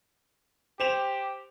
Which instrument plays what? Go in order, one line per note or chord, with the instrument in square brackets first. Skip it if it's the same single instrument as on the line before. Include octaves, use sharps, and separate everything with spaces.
[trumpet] G4 [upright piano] C5 E7 F7